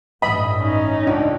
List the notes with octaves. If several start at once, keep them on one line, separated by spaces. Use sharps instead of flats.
A1 G2 D#5 E5 B5
C#4 D#4
C#2 D4